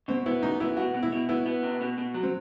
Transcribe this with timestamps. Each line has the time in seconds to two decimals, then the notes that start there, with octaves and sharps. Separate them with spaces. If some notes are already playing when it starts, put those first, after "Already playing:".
0.08 B2 C4
0.26 B3 E4
0.43 F#2 D#4
0.60 B3 E4
0.77 B2 F#4
0.94 B2
1.03 E4
1.12 B2
1.29 B3 E4
1.46 B3
1.63 C3
1.81 B2
1.98 B2
2.14 F#3
2.23 C4